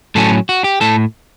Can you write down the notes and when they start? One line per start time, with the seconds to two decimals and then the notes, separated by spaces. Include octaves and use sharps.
0.15 A2 F#3 C#4 A4
0.49 F#4
0.64 G4
0.81 A2 A4